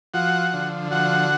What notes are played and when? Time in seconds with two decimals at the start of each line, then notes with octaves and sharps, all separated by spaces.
0.14 F3 F#4 F#5
0.53 D3
0.91 F3 F#4 F#5